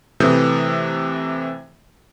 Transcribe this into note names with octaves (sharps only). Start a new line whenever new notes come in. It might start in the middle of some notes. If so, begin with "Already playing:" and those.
C3 E3 A3 D#6 G6